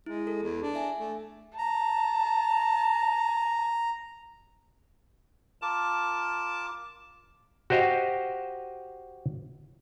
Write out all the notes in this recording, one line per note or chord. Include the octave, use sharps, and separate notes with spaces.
G#3 E4
A4
E2
D4
E5 G#5
A3
A5 A#5
F4 A#4 A5 D6
F#4 G4 C5 D#5 F5